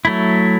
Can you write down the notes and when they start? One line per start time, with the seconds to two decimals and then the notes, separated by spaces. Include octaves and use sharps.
0.05 F#3 A3 E4